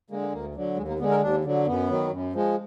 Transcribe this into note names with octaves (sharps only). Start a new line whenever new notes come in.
D3 G#3 A#3
A#3
D2 A#3
D3 F#3
D#2 G#3
A#3
D3 G#3 B3
A#4
D#2 D4
D3 F#3
F#2 B3
D#3 F#3
F#2
F3 G#3